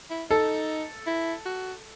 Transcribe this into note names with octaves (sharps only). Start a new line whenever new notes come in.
E4
D#4 A4
E4
F#4